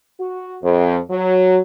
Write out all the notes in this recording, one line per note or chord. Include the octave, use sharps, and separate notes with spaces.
F#4
F2
F#3